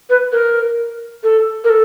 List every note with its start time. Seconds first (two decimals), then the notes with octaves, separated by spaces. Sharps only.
0.10 B4
0.32 A#4
1.23 A4
1.64 A#4
1.70 A4